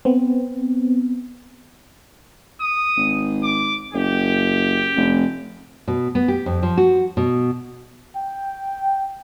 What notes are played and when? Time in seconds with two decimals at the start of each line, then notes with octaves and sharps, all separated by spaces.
0.05 B3 C4
2.61 D#6
2.97 G#1
3.43 D6
3.94 F#1 G4
4.96 F1
5.88 B2
6.15 B3
6.28 G4
6.46 F2
6.63 F3
6.77 F#4
7.17 B2
8.16 G5